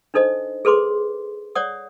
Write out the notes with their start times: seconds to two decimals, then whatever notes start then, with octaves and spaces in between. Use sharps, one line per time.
0.14 D4 D#4 A4 C5 D#5
0.65 G#4 A4 B4 C6 D6
1.55 C#5 D5 F#5 D#6